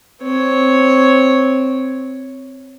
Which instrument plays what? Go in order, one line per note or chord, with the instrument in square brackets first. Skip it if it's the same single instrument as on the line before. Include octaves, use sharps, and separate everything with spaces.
[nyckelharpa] C4 C#5